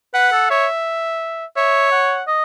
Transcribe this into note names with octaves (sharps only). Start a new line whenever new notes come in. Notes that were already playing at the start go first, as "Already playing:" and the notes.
B4 F#5
A4
C#5 E5
C#5 E5
F#5
D#5